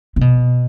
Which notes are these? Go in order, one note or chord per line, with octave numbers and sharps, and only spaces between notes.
C3
B2